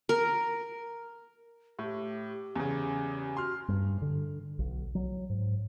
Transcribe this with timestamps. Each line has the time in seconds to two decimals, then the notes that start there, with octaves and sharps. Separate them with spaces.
0.09 A#4
1.79 A2 G4
2.56 E2 C#3
3.37 F#4 C6 F6
3.69 G2
4.02 D3
4.59 B1
4.95 F#3
5.30 G#2